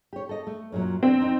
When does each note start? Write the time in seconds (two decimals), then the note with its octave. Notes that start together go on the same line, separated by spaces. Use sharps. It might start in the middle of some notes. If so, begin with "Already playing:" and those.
0.13 G4 C#5
0.29 A4 D#5
0.47 A3
0.72 F#2 A#2 F#3
1.03 C4 D4
1.21 F2 D#4